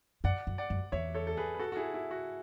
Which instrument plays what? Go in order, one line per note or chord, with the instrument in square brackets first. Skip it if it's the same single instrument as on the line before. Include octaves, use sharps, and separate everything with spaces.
[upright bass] F#2 [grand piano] D5 F#5
[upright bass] F#2
[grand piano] D5 F#5
[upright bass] F#2
[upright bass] E2 [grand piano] C#5 E5
[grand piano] A4 C#5
A4
G#4 B4
B4
F#4 A4
F#4
E4 G#4
E4
F#4